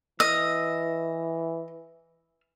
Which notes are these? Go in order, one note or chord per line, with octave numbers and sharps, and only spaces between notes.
E3 D#5 E6 F6